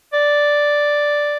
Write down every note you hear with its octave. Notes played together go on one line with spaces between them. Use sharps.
D5